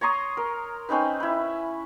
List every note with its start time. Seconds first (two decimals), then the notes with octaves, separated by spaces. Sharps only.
0.01 C#5 A#5 C6 D#6
0.37 A#4
0.89 C4 C#4 D#4 B4
1.20 E4 B5